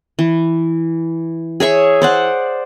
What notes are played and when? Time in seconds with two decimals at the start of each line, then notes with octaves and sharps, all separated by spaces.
0.19 E3
1.60 G#4 C#5 E5 C#6
2.02 C5 D5 F#5